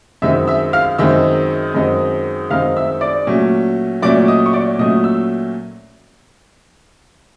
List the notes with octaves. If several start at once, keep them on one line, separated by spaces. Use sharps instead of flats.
F#2 D#3 G#3 C4 D#4 E5 E6
E5 E6
F5 F6
F#2 D#3 G#3 C4 D#4 E5 E6
F#2 D#3 G#3 C4 D#4
F#2 D#3 G#3 C4 D#4 F5 F6
E5 E6
D5 D6
A#2 F#3 A3 C#4
A#2 F#3 A3 C#4 D5 D6
D#5 D#6
C#6
D5 D6
A#2 F#3 A3 C#4 D#5 D#6
E6